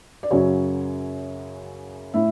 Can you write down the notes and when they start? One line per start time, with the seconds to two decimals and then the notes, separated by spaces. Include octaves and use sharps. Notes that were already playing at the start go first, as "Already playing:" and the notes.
0.23 D5
0.31 F#2 C#3 F#3 C#4 C#5
2.14 A2 E4 E5